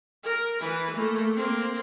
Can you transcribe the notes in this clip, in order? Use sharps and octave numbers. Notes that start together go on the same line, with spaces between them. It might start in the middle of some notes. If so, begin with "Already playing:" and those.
A#4
E3 B4
A3 A#3
A#3 C4